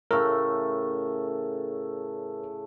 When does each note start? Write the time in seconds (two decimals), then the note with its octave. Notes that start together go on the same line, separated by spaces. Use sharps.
0.11 A2 C#3 A3 A#4